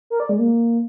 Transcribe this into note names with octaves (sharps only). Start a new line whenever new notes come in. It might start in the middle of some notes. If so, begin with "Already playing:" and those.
A#4
D5
G#3
A#3